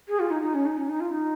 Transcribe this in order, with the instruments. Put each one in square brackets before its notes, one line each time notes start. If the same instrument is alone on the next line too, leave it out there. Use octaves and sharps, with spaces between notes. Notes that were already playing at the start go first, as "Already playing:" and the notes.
[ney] G#4
F4
D#4
D#4
C#4
D#4
C#4
D#4
F4
D#4